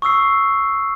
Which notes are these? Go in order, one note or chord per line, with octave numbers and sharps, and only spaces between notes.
C#6 D#6 E6 C7